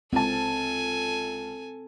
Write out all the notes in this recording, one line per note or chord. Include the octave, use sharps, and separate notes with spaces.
C#2 C4 A4 G#5 A5